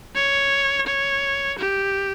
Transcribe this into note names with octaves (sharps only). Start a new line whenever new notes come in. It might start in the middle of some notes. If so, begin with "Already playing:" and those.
C#5
C#5
G4